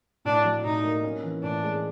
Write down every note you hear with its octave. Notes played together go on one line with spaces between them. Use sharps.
A2 D4
F#3
A2 D#4
A#3
C#4
E3
A2 D4
G#3